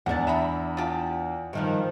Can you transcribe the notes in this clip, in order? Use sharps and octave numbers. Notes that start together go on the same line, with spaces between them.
E2 B3 D4 F#5 A5
E5 A#5 B5
F4 G4 A5
G2 D#3 F3